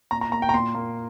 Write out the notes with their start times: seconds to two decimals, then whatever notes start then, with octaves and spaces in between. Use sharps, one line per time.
0.11 A#2 A#5
0.21 A#5
0.32 A#3 A#5
0.42 G5
0.49 A#5
0.54 A#2 C6
0.75 A#3